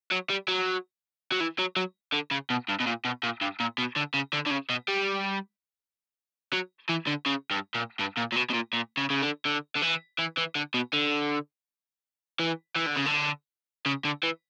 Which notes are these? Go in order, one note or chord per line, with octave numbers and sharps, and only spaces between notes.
F#3
G3
F#3
F#3
E3
F#3
F#3
D3
C#3
B2
G2
B2
A#2
B2
A#2
G2
A#2
B2
D3
C#3
D3
D3
C#3
B2
G3
F#3
E3
D3
C#3
G2
A#2
G2
A#2
A#2
B2
B2
A#2
A#2
C#3
C#3
D3
D3
D3
E3
E3
E3
D3
B2
D3
E3
E3
D3
C#3
D3
C#3
D3
E3